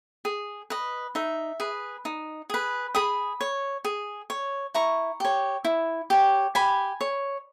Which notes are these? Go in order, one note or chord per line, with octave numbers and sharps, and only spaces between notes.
G#4
B4 D#5
D#4 E5
G#4 B4
D#4
G#4 B4
G#4 B5 D#6
C#5
G#4
C#5
E4 A#5 C#6
G4 C#5
E4
G4 C#5
G4 G#5 B5
C#5